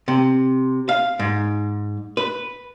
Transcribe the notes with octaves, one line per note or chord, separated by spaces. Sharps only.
C3
F5
G#2
B4